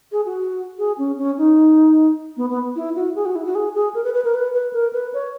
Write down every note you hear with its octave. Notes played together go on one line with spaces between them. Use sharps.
G#4
F#4
G#4
C#4
C#4
D#4
B3
B3
E4
F#4
G#4
F#4
E4
F#4
G#4
G#4
A#4
B4
B4
A#4
B4
B4
A#4
B4
C#5